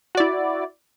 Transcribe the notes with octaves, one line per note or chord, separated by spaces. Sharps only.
E4 F#4 D5